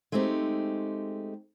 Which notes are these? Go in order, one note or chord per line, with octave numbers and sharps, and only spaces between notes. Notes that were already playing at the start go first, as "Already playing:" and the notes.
G#3 A3 C4 D#4 G4